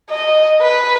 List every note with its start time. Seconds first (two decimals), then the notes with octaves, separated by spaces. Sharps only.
0.10 D#5
0.62 B4